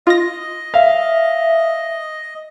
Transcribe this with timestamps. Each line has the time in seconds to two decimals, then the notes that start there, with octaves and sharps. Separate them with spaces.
0.07 F4 D#5 A#6
0.74 E5 F5